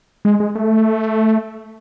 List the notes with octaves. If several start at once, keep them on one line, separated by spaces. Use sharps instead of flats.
G#3
G#3
A3